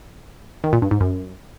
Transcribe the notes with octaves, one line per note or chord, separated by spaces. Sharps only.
D#3
A#2
G2
G#2
F#2